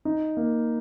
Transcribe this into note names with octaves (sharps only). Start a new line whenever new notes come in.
D#4
A#3